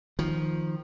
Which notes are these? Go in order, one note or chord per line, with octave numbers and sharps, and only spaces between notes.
D#3 F3